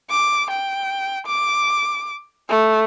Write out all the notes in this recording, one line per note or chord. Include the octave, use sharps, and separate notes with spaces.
D6
G5
D6
A3